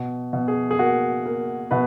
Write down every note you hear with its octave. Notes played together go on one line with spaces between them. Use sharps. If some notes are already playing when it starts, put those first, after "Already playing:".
Already playing: B2
B2
G#4
G#4
A#3 F#4
A#3
B2 B4